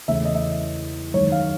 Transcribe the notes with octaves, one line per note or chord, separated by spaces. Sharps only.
E2 C#3 E3 A3 E5
D#5
E5
F#2 D#3 G#3 C#5
F5